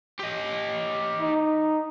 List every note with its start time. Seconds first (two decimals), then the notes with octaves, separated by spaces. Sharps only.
0.19 G4 D#5
1.20 D#4